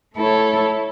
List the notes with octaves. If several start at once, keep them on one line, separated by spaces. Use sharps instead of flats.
A3 E4 A4 C#5